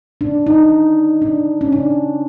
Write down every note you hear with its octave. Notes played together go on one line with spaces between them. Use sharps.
D4
D#4
D4
C#4
D4